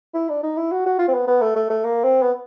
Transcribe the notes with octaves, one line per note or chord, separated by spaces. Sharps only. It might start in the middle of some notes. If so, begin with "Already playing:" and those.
E4
D4
D#4
E4
F#4
F#4
F4
C4
B3
B3
A3
A3
A3
A#3
C4
B3